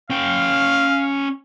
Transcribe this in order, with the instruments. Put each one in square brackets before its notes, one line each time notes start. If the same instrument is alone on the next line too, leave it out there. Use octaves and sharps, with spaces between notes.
[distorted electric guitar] C#4 G5 [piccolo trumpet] F5